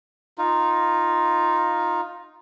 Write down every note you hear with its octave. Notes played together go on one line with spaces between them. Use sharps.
D#4 F4